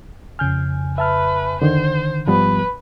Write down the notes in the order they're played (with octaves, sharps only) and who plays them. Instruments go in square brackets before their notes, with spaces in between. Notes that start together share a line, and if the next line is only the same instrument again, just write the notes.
[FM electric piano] F2 C#3 G#5 [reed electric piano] F6 G6
[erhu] B4 [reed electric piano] E5 A5 F6
[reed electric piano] D3 D#3 [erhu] C5
[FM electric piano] G#2 [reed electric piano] F3 G3 B3 [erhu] B4